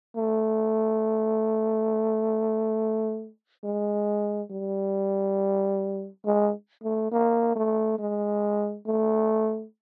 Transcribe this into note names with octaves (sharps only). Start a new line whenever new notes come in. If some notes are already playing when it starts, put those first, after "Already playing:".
A3
G#3
G3
G#3
A3
A#3
A3
G#3
A3